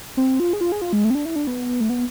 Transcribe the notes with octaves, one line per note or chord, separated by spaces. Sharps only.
C4
F4
G#4
F4
G#4
F4
G#3
A3
C4
D4
E4
D4
B3
A3
B3